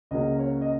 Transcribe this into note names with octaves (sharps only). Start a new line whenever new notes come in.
C#2 C#3 F#3 A#3 D#5
C#5
D#5